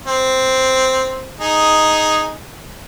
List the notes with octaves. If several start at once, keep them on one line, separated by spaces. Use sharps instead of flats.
C4
D#4 G#4